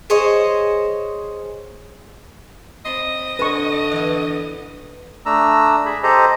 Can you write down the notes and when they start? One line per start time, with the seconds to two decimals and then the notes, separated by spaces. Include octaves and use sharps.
0.10 G#4 C5 C#5 D#5
2.85 C4 D#5 A5 B5 C6
3.39 D3 B4 A5 C#6
3.92 E3 B3
5.26 A3 D4 A#5 E6
5.85 G#4 B5
6.03 G4 A4 C5 D#5 A#5